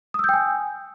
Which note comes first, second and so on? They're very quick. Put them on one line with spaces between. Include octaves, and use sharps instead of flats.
D#6 E6 G6 G5 G#5